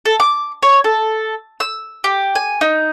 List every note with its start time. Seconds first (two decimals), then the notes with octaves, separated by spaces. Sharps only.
0.05 A4
0.20 D6
0.63 C#5
0.84 A4
1.60 E6
2.04 G4
2.35 G#5
2.61 D#4